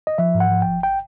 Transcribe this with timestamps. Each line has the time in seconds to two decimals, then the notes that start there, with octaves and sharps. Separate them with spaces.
0.07 D#5
0.18 F3 E5
0.35 G#2
0.40 F#5
0.51 F3
0.62 G#1 G5
0.83 G5